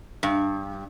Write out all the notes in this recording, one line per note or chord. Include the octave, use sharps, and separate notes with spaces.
G2